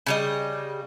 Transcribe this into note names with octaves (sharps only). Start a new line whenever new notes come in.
C#3 G3 D#5